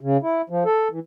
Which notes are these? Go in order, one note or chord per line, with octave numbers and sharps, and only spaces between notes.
C#3
E4
F3
A4
E3